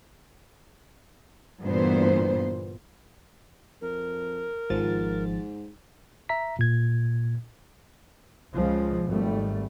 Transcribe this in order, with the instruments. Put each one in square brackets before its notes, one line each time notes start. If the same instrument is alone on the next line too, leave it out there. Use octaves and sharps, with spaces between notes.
[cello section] D2 G2 A#2 E3 B3 C5
[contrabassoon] F2 [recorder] A#4
[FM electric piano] G#1 F3 A6 [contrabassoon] G#2
[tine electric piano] E5 A#5 B6
A#2 G#6
[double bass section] C#2 C#3 F3 G#3
G#1 G#2 G3 A3